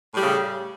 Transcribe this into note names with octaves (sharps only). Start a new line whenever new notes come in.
A2 C#3 G3